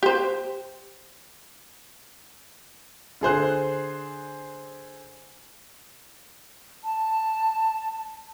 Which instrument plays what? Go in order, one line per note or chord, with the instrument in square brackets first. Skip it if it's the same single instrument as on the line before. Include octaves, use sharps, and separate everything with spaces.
[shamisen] G4 C5
[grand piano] D3 G#4 C5 F#6
[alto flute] A5